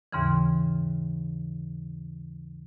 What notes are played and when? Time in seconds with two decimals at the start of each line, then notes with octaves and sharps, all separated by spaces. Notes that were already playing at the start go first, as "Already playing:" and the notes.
0.12 D#2 G#2 C#3 E3